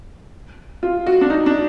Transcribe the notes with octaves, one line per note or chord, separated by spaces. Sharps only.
F4
F#4
D4
D#4
D4